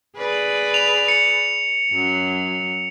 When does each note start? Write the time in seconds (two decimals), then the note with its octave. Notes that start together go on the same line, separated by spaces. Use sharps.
0.17 G#4 B4 D5
0.74 F7
1.08 C#7
1.91 F#2 F#3